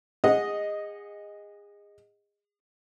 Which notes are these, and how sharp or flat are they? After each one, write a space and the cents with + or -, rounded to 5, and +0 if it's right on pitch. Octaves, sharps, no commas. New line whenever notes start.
G#4 -30 D#5 +0 F#5 -15